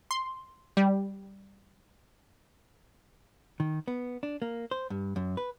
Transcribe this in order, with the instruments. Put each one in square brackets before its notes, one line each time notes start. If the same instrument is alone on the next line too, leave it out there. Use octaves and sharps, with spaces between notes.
[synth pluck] C6
G3
[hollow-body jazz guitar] D#3
B3
D4
A#3
C5
G2
F#2
B4